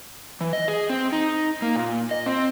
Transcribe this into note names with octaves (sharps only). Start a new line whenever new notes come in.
E3
D#5
G#4
C4
D#4
A#3
A#2
D#5
C4